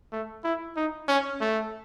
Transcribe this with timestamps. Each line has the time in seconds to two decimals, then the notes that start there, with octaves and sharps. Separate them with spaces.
0.12 A3
0.44 E4
0.76 D#4
1.08 C#4
1.40 A3